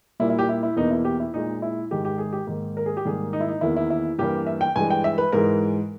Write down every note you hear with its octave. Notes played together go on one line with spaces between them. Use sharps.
A#2 G3 A#3 E4
E4
G4
E4
E4
E2 B2 A#3 D#4
E4
G4
E4
A#2 G#3 D#4
E4
G#2 D#3 G#3 G4
G4
G#4
G4
G#2 D#3 A#3
A#4
G#4
G4
G#2 D#3 G3 A#3 G#4
D#4
E4
D#4
E2 D#3 A#3 E4
E4
E4
G2 E3 G3 A#3 G4
E5
G5
G2 E3 G#3 G#5
G5
E5
B4
G#2 E3 G#3 A#4